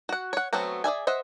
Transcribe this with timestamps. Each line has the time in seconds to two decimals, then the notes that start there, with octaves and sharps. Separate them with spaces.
0.09 F#4 F#5
0.33 C#5 F#5
0.53 F#3 A3 B3 C4 F#4
0.84 G#4 D5 E5 G#5
1.07 C5 D#5 E5 F#5